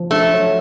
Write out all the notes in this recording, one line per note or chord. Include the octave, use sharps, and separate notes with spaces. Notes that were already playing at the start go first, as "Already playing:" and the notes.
Already playing: F3
A3 D4
F#3